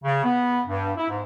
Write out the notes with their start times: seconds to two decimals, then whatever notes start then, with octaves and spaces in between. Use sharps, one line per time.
0.04 C#3
0.24 B3
0.67 G2
0.97 E4
1.10 G#2